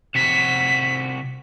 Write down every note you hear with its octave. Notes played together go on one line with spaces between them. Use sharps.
C2 F#4 B6